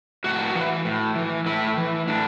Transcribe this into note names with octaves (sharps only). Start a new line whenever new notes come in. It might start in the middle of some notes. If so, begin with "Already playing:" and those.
A2 F#4
E3
A2
E3
A2 E4
E3
A2 D4